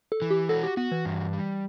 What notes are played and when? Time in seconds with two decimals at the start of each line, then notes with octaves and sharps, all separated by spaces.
0.12 A4
0.22 E3
0.31 G4
0.49 F#4 A4
0.64 G4
0.77 B3 F#4
0.92 E3
1.05 G2
1.33 G3